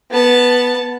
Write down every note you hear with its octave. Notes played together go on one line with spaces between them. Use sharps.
B3 A5